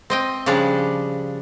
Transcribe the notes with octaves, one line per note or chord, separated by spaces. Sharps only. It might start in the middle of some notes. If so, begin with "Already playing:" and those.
C4 D#5 G5
C#3 F3 G3 D4